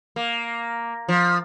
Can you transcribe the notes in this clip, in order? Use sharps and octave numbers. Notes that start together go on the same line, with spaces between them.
A#3
F3